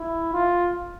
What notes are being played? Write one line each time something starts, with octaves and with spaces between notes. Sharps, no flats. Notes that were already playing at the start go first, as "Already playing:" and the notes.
Already playing: E4
F4